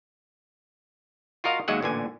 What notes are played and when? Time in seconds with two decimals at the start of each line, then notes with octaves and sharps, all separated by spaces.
1.44 F4 F#4 A#4 D#5 F5
1.68 D#2 F#3 G#3 D#5 E5 F#5
1.83 A1 A#2 D3 G#5